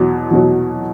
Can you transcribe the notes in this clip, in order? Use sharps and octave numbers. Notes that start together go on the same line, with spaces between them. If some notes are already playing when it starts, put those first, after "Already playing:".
Already playing: E2 B2 F#3
E2 B2 F#3